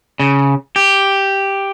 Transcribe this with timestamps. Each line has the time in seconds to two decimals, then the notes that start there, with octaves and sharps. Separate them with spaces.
0.20 C#3
0.76 G4